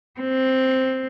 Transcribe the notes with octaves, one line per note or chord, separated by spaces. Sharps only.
C4